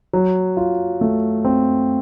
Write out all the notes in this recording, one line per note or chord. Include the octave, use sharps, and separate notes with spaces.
F#3
F4
A3
C4